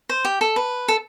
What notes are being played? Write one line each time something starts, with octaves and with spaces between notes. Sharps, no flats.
C5
G4
A4
B4
A4